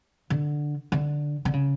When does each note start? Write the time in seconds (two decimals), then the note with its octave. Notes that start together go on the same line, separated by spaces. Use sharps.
0.30 D3
0.92 D3
1.45 D3
1.53 C#3